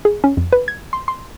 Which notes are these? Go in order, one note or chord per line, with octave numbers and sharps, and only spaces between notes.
G#4
C#4
F2
B4
G#6
C6
C6